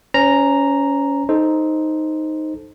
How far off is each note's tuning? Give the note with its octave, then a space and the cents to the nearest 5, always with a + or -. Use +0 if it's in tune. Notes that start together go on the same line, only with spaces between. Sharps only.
C#4 +15 C5 -30 A#5 +0
D#4 +0 A4 -15 C5 +0